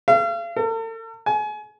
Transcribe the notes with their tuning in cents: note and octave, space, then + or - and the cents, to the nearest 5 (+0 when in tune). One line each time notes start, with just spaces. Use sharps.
F5 -40
A4 +45
G#5 +30